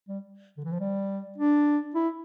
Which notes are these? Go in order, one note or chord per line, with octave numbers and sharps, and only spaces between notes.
G3
D3
E3
F3
G3
D4
E4